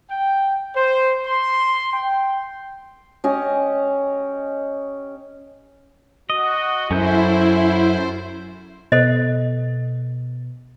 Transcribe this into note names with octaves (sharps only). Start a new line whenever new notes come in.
G5
C5
C6
G5
C#4 G4 D#5
F#4 D#5
F#2 C#4 E4 A4 C5 G6
B2 A4 C5 D#5